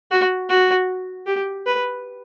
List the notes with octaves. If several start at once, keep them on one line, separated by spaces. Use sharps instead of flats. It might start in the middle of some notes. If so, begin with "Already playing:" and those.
F#4
F#4
G4
B4